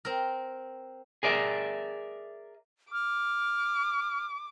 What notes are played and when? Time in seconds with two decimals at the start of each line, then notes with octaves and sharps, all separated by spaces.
0.05 C4 A#4
1.23 G#4 A#4 D5 E5
2.93 D6 F6